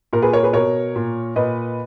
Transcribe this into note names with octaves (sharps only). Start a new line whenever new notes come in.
A#2 A#4
G#4 B4
A#4 C#5
G#4 B4
B2 A#4 C#5
A#2
A#2 B4 D#5